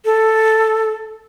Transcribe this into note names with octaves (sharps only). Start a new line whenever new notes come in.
A4